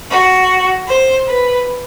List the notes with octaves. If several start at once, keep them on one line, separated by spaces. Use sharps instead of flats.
F#4
C5
B4